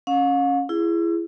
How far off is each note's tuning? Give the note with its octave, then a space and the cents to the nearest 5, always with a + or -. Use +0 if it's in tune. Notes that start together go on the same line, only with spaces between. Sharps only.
C#4 -5 F5 +45
E4 +30 G#4 +0